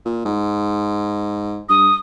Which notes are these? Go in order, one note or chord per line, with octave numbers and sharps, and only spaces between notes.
A#2
G#2
G2 D#6